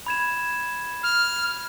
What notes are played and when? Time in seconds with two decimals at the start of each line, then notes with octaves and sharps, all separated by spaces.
0.07 B5 G#6 E7
1.03 F6